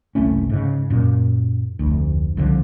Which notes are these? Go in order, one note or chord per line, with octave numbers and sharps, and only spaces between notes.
F#1 C2 A3 C#4
G#2 C#3
F#2 A#2
F1 D2
C2 D3 F3